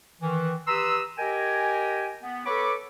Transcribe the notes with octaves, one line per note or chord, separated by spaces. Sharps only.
D#3 E3
G4 B4 A#5 C6 D#6 E6
G4 A#4 D#5 G5 G#5
B3
A4 B4 C#5 B5 C#6 D6